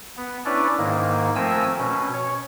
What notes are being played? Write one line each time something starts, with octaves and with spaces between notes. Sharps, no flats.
B3
C#4 D4 E4 B4 C#5 D5
G#2 D#3 A#3
F3 A3 C4 A#4 G#5 E6
B2 C#4
C#5